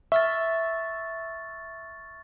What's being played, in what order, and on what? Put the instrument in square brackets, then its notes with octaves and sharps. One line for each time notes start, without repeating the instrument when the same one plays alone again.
[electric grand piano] E5 [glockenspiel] C#6 F6 A6